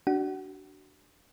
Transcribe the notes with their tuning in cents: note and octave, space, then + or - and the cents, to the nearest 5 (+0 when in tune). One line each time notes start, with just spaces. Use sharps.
D4 +5 F#4 +30 F#5 +30